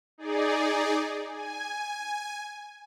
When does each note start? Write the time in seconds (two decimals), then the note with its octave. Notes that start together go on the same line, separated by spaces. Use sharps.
0.18 D#4 G#4 D5
1.29 G#5